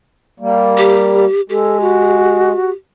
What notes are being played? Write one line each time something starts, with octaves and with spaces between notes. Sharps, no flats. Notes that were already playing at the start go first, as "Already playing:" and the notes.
G3 A#3
G4
G#3 G4 A4
F#4